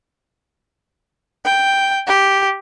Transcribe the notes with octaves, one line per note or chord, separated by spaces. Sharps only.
G5
G4